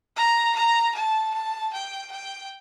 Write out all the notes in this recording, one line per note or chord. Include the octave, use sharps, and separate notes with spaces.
A#5
A#5
A5
A5
G5
G5